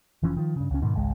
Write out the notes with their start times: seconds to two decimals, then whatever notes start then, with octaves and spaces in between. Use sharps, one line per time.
0.23 F1 E3 F3 C#4
0.37 D#3 F3
0.56 G2 C#3
0.71 C#2 C#4
0.82 G#2 B2 D#3
0.95 G#1 C#2 G#3